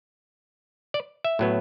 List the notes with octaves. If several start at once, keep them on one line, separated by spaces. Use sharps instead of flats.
D5
E5
A2 F#3 B3